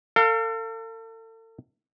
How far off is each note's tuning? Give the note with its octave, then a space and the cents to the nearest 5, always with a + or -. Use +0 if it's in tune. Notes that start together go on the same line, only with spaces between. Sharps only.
A4 +40 F5 +0